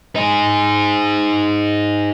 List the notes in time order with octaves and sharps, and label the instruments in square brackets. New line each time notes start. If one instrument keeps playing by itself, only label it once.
[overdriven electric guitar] D#4 G#4